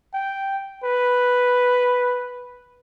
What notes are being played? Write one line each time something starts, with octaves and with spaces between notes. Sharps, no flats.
G5
B4